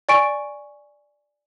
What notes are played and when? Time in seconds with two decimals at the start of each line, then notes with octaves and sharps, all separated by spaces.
0.09 D5 G#5 C#6 D7